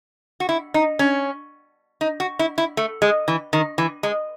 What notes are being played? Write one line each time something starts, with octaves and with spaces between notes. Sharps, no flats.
F#4
E4
D#4
C#4
D#4
F#4
E4
E4
A3
G#3
E3
D#3
E3
G#3